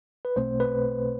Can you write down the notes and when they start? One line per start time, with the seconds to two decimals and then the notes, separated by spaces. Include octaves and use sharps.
0.25 B4
0.36 B1 B2 A3 C4 C5
0.60 B4